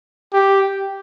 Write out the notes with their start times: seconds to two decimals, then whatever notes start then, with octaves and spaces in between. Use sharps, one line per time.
0.33 G4